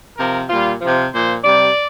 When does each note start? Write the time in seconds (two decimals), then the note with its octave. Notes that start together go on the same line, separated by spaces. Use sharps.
0.17 C3 F3 A#4
0.49 A#2 G3 F4
0.81 C3 F3
1.12 A#2 F3 C5
1.44 C3 G3 D5